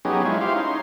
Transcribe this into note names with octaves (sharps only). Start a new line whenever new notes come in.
F#3 B3 C#4 D#4 G4 G#4
G#3 E4 F4 C#5
E4 F4 G4 C5 F5
C#4 D#4 C6